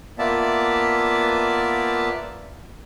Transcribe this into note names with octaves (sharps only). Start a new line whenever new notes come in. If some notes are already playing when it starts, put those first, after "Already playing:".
A#3 B3 F4 D5 E5 A5